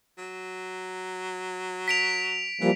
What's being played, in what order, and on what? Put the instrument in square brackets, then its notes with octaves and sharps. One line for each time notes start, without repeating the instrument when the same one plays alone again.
[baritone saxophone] F#3
[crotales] B6 D7 F7
[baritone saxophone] E3 [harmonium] F3 G3 A#3